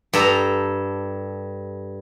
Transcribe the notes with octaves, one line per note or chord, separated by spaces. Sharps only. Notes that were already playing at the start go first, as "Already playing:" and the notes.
G2 A4 A#5